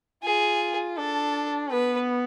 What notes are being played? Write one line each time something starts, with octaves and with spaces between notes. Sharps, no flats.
F4 G#4
D4 A4
B3 B4